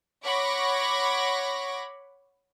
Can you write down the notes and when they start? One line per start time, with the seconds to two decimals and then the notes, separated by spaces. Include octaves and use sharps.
0.24 C#5 F#5 B5 C#6 D6 A#6